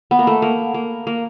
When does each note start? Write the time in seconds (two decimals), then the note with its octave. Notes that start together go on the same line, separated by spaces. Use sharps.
0.11 B3
0.19 A#3
0.27 A3
0.42 A#3
0.74 A#3
1.07 A#3